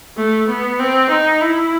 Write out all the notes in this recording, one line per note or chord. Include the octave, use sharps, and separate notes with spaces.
A3
B3
C4
D#4
E4